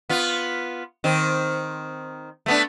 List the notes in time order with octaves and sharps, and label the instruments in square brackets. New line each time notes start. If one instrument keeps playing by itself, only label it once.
[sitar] B3 F4
D#3 C4
A3 B3 D4